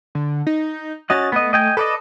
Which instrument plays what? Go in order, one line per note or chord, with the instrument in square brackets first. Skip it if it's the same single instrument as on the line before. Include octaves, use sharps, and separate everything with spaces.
[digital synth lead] D3
D#4
[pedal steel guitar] C#4 F#4 D#5 [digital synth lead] A6
[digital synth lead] A3 [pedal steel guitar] B3 D#5
[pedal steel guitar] D#5 G5 G#5
[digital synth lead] A4 [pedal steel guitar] B4 D5 D#5